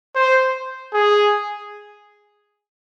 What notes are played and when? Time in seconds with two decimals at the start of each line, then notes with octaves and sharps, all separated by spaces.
0.16 C5
0.94 G#4